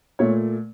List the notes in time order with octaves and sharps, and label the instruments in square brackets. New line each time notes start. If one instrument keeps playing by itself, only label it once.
[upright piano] A#2 A3 C#5